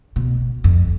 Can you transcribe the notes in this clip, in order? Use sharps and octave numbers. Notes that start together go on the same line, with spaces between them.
B2
F2